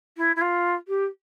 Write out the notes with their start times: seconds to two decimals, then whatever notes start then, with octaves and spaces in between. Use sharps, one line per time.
0.17 E4
0.36 E4
0.41 F4
0.88 G4